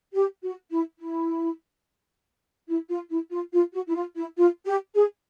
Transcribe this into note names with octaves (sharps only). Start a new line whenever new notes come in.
G4
F#4
E4
E4
E4
F4
E4
F4
F4
F#4
E4
F4
E4
F4
G4
G#4